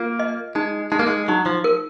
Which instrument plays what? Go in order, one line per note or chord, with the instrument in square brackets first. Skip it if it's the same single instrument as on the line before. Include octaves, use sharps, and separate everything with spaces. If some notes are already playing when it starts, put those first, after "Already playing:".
Already playing: [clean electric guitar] A#3 [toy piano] F4
[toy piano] D#5
[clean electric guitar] G#3 [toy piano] D#4
[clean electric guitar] G#3 [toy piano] D#4
[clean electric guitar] A#3
G#3
[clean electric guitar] F#3 [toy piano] D#4
[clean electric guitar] F3
[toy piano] A#4